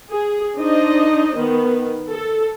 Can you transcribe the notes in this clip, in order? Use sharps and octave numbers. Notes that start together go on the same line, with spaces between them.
G#4
D4 D#4 C5 D#5
D#3 B3
A4